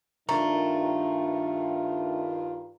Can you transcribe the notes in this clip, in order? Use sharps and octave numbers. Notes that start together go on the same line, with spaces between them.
G2 D#3 A3 D4 F4 A#4 A#5